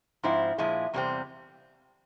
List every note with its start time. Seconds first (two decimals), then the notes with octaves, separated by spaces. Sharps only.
0.23 G#2 F3 C4 E4
0.58 A#2 F3 G#3 E4
0.93 E2 C3 G3 C4